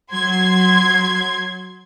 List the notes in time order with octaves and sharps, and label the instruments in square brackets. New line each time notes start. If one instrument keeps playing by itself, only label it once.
[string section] F#3 C6 G#6